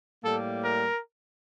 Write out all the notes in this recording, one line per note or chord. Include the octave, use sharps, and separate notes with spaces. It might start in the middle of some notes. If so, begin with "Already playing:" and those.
A2 G3 A#3 A4
A#4